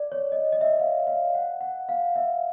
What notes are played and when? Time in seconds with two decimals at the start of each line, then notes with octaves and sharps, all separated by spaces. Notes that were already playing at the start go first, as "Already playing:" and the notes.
Already playing: D5
0.12 C#5
0.32 D#5
0.52 D#5
0.61 E5
0.70 D#5
0.80 F5
1.07 F5
1.34 F#5
1.61 F#5
1.89 F5
2.16 E5